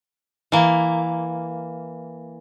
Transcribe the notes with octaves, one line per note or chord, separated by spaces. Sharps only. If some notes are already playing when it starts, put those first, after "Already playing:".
E3 A#3